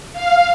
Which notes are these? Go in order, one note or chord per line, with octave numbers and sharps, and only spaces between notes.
F5